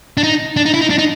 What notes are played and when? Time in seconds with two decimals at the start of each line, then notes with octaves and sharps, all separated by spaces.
0.17 D4
0.23 D#4
0.57 D4
0.65 D#4
0.74 E4
0.81 D#4
0.90 D4
0.98 D#4